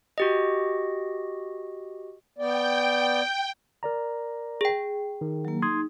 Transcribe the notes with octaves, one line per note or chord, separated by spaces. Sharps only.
F#4 G4 D#5
B3 D5 G5
A#4 D5 A#5
G#4 G5
D#3
F#3 A#3
D#4 C6 D#6 G#6